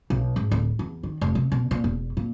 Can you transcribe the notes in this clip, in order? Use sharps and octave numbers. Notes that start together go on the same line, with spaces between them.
B1
G#2
D1
E2
D#3
F1
C3
B2
A#2
E1
A#2